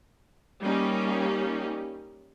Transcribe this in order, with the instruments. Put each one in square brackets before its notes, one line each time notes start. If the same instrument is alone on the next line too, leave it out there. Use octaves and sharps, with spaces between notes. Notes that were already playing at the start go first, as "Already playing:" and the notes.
[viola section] G3 A#3 C#4 D#4 G4